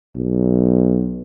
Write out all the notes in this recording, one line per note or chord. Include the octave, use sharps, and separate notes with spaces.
B1